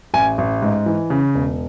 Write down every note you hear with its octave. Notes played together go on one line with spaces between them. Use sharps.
A1 G#5
A1
G#2
E3
C#3
E1